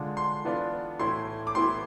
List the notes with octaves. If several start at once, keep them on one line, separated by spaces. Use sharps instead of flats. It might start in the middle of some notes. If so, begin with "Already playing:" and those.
Already playing: D3 G#3 D4 F4
C6
E3 B3 D4 F4
A2 E3 A3 E4 C6
D6
A2 E3 B3 E4 C6